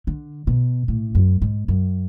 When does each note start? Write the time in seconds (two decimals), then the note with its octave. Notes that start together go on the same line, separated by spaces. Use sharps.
0.07 D3
0.47 B2
0.88 A2
1.15 F#2
1.42 G#2
1.68 F#2